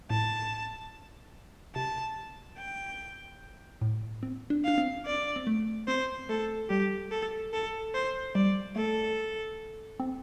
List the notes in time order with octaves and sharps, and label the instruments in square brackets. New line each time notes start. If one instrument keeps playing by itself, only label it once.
[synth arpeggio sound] A2 [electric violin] A5
[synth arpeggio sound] C3 [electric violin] A5
[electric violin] G5
[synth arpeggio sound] A2
C4
D4
[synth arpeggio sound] D4 [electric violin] F5
[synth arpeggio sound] C4
[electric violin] D5
[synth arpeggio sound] C4
A3
[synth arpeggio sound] C4 [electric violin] C5
[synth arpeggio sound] A3 [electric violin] A4
[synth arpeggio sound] G3 [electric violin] G4
[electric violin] A4
A4
C5
[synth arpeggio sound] G3 [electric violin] D5
[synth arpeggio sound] A3 [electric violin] A4
[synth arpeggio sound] C4